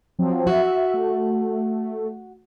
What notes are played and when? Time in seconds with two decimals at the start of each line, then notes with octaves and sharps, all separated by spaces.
0.19 F3 F#3 C4
0.47 F#4 E5
0.94 A3